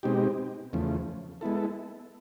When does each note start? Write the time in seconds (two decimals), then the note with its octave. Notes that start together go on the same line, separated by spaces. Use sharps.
0.03 B2 G#3 C4 D#4 G4
0.73 E2 C#3 F3 A3
1.41 G#3 B3 E4 A4